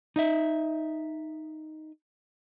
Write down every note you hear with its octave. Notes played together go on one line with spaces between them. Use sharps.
D#4 D#5 E5